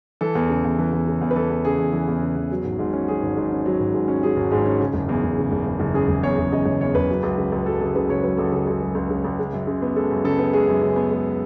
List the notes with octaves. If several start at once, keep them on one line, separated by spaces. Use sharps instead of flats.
E3 A4
E2
C#3
E2
E3
E2
C#3
E2
B4
E3 A4
E2
C#3 G#4
E2
E3
E2
C#3
E2
F#3
G#1
G#2
C#4
F#3 G#4
G#1
G#2
C#4
F#3
G#1
G#2
C#4
F#3 G#4
G#1
G#2 G#4
C#4
C#3
F#1
E2
F#1
C#3
F#1
E2
F#1
C#3 G#4
F#1
E2 C#5
F#1
C#3 D#5
F#1 C#5
E2 C#5
F#1 B4
F#3
C#2
C#3
C#2
F#3 A4
C#2 G#4
C#3 B4
C#2 C#5
F#3 B4
C#2 A4
C#3 G#4
C#2 G#4
F#3
C#2
C#3
C#2
G#3
F#2
C#3
B3
G#3 A4
F#2
C#3 A4
B3
G#3 G#4
F#2
C#3
B3
G#3